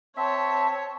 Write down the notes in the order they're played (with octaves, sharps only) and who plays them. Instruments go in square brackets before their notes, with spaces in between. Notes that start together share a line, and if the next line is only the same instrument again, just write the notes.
[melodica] C4 E5 [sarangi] C#5 [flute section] A5